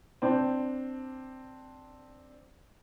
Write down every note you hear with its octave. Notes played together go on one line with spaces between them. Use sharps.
C4 D4